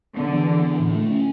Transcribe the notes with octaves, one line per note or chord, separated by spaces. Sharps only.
D3 B3
E3
B3
E3
A2
A3
C#4